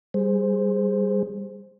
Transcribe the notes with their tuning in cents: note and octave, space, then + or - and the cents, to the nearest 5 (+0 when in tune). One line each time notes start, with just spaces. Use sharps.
G3 +5 G#4 +0 C5 +0